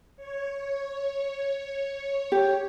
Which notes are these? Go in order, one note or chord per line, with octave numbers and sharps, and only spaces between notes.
C#5
G4